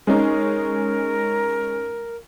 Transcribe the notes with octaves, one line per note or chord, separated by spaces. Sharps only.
G#3 C#4 D#4 A#4